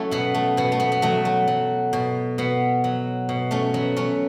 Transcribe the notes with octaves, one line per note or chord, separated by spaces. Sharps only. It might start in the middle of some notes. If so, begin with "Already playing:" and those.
Already playing: F#3 A3 C#4 E4
B2 B3
A3
B2 B3
A3
B3
B3
F#3 A3
A3
F#3
B2
B2 B3
F#3
B2
A3 C#4
F#3 B3
A3 C#4